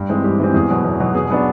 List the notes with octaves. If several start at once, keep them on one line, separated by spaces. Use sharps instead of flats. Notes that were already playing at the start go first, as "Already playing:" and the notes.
Already playing: G2
E3 G#3 C4
G2 G4
E3 G#3 C4
E2 G#4
B2 F#3
E2
B2 F#3
B2 G#4
F#3 B3 D4